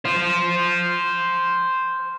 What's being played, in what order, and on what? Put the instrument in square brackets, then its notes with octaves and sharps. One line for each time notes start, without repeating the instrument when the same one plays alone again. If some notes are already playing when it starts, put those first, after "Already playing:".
[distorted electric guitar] C5 F5